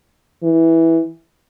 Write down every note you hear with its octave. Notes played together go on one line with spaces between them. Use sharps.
E3